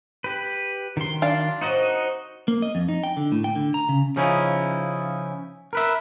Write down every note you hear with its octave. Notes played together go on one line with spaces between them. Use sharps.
G4 B4
D#3 F#3 C6
D4 F5
C4 D#4 F#4 A#4 C#5 D#5
A#3
D#5
F2
D#4
G5
D3
A2
G5
D3
A#5
C#3
C#3 F3 C#4 D#4 E4
A#4 B4 E5